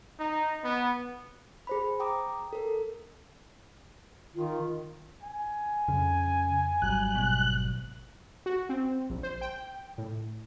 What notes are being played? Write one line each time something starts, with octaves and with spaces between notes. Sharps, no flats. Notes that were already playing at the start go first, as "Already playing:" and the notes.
D#4
B3
G#4 C5 B5
G5 A#5 D6 D#6
A4 A#4
D#3 F4
G#5
F2 C#3
G#1 F#3 G3 F#6
B2
F#4
C4
A#1
C5
G5
A2